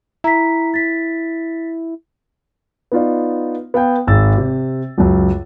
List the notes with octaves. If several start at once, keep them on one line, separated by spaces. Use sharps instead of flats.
E4 A#5 B6
A6 B6
B3 D#4 F4 D5
B3 F5 G5
G#1 G#3 D#4 E6 A6
C3
C#2 F#2